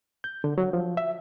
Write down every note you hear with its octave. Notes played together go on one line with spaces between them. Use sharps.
G6
D3
F#3
F3
E5